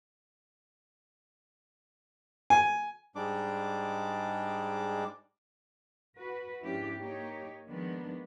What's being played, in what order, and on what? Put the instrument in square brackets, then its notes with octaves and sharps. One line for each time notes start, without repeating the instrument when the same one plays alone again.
[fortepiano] G#5
[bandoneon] G#2 G3 G#3 D4 D6
[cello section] F#4 B4
G#2 F3 C#4 D4 E4 G4
A#3 D#4 G4 C#5
D#3 F3 G#3 B3 D4